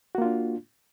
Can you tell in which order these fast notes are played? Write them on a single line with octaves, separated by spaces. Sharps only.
F#4 A#3 F4 D4